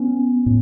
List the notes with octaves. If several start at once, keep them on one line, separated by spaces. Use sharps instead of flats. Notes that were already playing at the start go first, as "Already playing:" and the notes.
Already playing: B3 C#4
A2